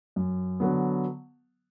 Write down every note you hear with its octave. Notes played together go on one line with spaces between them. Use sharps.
F#2
D3 F#3 B3